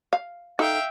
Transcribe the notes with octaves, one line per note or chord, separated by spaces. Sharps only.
F5
D#4 A4 E5 F5 G5